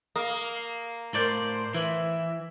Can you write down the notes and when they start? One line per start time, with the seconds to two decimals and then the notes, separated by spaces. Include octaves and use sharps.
0.16 A#3 D#6
1.14 A2 A#4 C5 D5 G6 A6
1.74 E3 B4 E5 F#7